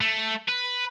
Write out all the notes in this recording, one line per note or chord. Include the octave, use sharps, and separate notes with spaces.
A3
B4